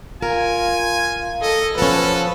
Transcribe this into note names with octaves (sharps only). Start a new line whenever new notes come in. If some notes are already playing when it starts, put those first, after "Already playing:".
F4 A#4 G#5
A4 D#5
F3 B3 C#4 A4 B4